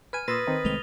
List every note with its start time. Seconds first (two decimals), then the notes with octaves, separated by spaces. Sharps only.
0.13 B4 G#5 F6 G#6 D#7
0.28 A#2 B4 C6 D#6 E6 A6 A#6
0.47 D#3 C4 D#4
0.65 C2 G#3 A3 F7 G7